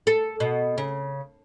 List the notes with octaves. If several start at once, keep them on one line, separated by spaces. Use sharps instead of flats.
A4
B2
C#3